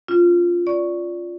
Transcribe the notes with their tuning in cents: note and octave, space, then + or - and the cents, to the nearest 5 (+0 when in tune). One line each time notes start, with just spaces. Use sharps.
C#4 +0 F4 +0
D5 -10 C#6 +0